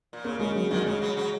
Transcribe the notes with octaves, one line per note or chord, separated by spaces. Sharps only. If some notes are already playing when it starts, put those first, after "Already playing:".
A#2
C#3 A#3
C#3 G#3
C#3 F#3
A#2 D#3 F#3
C#3 G#3
C#3 F#3
C#3 F#3